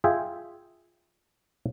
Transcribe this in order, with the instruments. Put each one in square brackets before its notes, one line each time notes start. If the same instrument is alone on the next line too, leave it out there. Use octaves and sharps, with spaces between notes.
[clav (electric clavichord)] F4 G#4 E5 G5